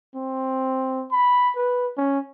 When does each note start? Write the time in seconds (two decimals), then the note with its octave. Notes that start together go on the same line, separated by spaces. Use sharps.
0.15 C4
1.12 B5
1.56 B4
1.97 C#4